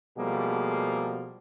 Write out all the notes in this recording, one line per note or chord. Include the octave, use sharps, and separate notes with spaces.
B2 F3 G3 A3 A#3 G#4